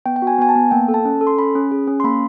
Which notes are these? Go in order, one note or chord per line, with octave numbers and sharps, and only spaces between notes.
B3 G5
G5
F#4
G#5
B3 G#5
A5
B3
A#3 G5
A4
A5
C#4
A4
C6
C#4 B5
C#4
G#4
C#4
C6
A#3 B5